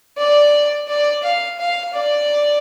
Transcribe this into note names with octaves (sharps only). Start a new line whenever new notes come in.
D5
D5
F5
F5
D5